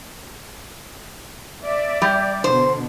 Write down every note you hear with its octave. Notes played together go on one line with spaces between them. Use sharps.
D5 E5
G3
B2 D3 C5